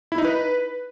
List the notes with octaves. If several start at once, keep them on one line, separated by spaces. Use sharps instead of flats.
E4
D#4
B4